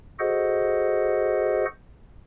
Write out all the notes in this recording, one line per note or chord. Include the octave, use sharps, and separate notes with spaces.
F#4 G#4 A4 C5 D#5 F#5